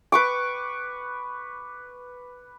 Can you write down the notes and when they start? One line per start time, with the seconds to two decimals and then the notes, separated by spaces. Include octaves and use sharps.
0.12 B4 C#6 D6